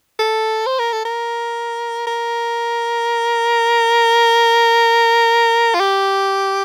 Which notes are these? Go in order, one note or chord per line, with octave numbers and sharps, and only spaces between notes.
A4
C5
A#4
A4
A#4
A#4
F4
G4